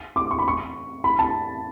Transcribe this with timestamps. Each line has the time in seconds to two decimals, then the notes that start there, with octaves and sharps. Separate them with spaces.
0.16 D6
0.31 C#6
0.39 B5
0.48 C#6
1.04 B5
1.19 A5